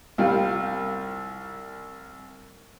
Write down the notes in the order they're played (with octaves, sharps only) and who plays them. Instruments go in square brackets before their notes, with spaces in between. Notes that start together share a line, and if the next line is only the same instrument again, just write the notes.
[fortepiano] C2 G3 F4 F5 G5